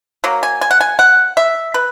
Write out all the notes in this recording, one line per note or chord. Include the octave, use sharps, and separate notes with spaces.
F#3 A#3
G#5
G#5
F#5
G#5
F#5
E5
B4